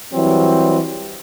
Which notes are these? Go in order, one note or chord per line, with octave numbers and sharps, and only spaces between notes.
E3 F#3 G3 C4